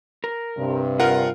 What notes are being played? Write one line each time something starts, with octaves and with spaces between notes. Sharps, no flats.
A#4
G2 C3
F4 A#4 F#5